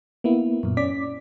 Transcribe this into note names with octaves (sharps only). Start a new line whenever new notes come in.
A#3 B3 E4
F#2 A#2
C#4 D5 D6 B6